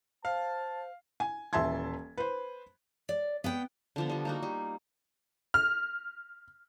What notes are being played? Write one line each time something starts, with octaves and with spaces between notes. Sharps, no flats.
C5 F5 A5
G#5
D#1 E3 E5 A5 C6 G#6
B4 C5
D5
B3 F#5 G5
D3 F3 B3
F3 G3
A#3 D#4 F#4
G3
F6